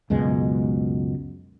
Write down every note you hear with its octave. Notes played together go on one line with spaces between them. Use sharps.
C#2 F#2 B2 G#3